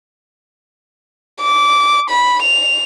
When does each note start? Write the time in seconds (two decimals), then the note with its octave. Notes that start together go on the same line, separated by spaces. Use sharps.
1.41 D6
2.10 B5
2.42 F7